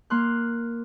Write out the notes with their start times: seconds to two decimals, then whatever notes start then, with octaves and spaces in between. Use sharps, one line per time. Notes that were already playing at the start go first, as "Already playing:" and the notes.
0.10 A#3 C6 F6 F#6